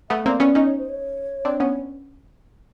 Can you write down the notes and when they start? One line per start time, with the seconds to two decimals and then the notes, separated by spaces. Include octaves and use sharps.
0.10 A3 B3 E5
0.26 A#3 C4 D5
0.40 B3 C#4 D5
0.55 C#4 D#4 D#5
0.67 C#5
0.78 C5
0.89 C#5
1.45 C4 D4
1.60 B3 C#4